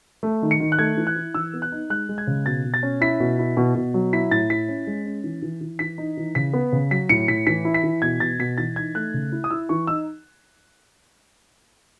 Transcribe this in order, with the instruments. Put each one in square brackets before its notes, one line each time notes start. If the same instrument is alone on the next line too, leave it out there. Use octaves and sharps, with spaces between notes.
[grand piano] A3
D#3
C#7
D#3
F#6
A3 G#6
E3
F#6
E4
E3 E6
B3
F#6
D#4
G#3 F#6
G#3
G#6
C#3
B2 A6
B2
A6
C#4
E4 B6
B2
E4
B2
B2
F#3
E4 B6
A2 A6
E4 B6
C#4
G#3
C#4
E3
E3
E3
E3 B6
D#4
E3
C#3 B6
B3
C#3
F#3 B6
A2 C#7
A2 B6
E3 B6
E4
B6
E3
B2 G#6
B2 A6
B2 B6
E3 A6
D#4 G#6
A3 F#6
C#3
E4
D#6
E4 E6
E3 C#6
D#4 E6